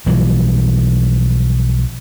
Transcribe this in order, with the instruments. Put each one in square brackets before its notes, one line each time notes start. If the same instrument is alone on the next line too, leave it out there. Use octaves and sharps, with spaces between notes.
[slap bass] B1 E3 F3 G3